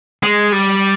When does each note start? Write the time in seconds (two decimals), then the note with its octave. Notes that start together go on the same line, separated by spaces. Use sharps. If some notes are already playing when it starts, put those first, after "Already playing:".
0.23 G#3
0.52 G3